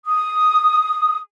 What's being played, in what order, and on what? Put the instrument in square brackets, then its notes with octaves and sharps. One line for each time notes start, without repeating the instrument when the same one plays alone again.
[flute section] D#6